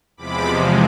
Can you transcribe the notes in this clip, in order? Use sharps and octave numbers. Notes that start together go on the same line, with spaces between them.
E2 C3 F3 G#3 B5 D6